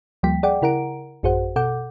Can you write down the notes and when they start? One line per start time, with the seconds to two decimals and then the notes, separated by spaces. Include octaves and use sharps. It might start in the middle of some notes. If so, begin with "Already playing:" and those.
0.23 D2 F3 G3 A#3 G5 B6
0.43 G#4 D5 F#5 G5 D6
0.62 C#3 E4 A#4 F#5 A#5 D7
1.23 A1 F#2 F#4 G#4 C5 F#5
1.56 B2 A4 F#5 D6 G6